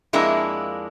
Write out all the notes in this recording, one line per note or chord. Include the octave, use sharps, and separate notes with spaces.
F2 G#3 A#3 D4 E4